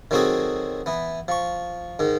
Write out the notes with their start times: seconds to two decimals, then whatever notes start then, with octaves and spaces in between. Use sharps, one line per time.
0.11 D#3 F#3 C4 F#4 G#4 A4
0.86 E3 B3
1.28 F3 C#6
1.99 G#2 D#3